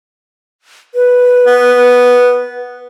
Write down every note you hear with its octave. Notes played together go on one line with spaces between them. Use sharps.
B4
B3